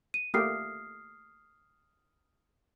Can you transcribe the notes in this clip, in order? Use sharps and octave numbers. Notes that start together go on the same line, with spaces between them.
D#7
A3 A#3 G4 D#6 F6 C7